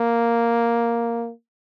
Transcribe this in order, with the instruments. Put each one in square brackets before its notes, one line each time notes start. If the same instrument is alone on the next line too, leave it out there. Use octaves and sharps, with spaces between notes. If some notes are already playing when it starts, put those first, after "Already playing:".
Already playing: [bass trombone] A#3